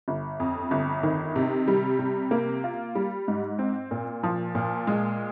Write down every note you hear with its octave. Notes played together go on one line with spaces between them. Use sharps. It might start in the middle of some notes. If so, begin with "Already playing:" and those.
G1
F2
G1
D#3
C3
G3
C3
A#3
F4
G3
G#2
C4
A#2
F3
A#2
G#3